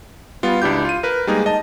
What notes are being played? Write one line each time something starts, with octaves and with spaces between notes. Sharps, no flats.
G3 B3 F4
C#2 D4 E4 G4 G6
F4 D#7
A#4 B4
G3 G#3 A#3 D#4 G#4
D#5 A5